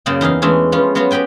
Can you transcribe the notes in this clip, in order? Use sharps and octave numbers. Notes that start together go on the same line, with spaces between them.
F#2 C#3 A#3 G#4 D5 G5
E2 D#4 G#4 F5
E3 G#3 A3 C#4 D4 G#4
F3 B3 C#4 F4
F#3 B3 F4 F#4 C#5
G4 G#4 B4 G5 G#5